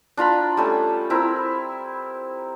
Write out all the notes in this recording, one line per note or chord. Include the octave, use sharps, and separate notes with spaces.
D4 F4 A#5 B5
G3 A3 C#4
C4 E4 A#4